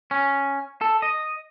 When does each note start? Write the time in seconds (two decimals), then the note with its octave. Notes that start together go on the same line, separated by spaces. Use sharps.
0.11 C#4
0.81 A4
1.02 D#5